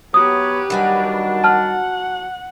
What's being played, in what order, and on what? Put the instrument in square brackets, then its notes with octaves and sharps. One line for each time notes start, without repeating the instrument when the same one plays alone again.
[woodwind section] F#3 B3 C#5 [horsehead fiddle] G4 B4 [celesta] D#6
[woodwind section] D#3 G3 D4 [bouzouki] F#3 F#4 G#5
[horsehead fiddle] F#5 [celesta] A5 F6